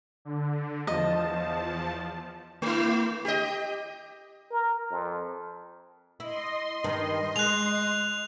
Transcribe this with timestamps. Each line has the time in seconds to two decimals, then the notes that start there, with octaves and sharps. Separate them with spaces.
0.25 D3
0.87 E2 F3 D#5 A5
2.62 A3 E4
3.25 G4 D#5
4.51 A#4
4.91 F2
6.20 E4 D#5 C6
6.84 G2 D#3
7.36 G#3 F#6 F7